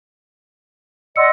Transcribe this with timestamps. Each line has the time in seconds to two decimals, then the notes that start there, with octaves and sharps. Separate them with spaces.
1.16 D5 D#5 F#5 C6 E6 C#7